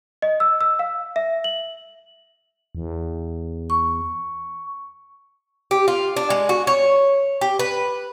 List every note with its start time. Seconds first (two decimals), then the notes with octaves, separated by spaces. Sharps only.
0.22 D#5
0.40 E6
0.61 E6
0.79 F5
1.16 E5
1.44 F#7
2.75 E2
3.70 C#6
5.71 G4
5.88 F4
6.17 D4
6.30 G#3
6.49 F#4
6.67 C#5
7.41 G4
7.59 B4